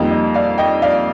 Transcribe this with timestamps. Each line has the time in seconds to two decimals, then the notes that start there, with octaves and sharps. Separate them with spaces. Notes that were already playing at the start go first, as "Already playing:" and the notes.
Already playing: F2 D#3 G3 A#3 D#5 G5
0.11 D#5
0.34 D5 F5
0.58 D#5 G5
0.82 D5 F5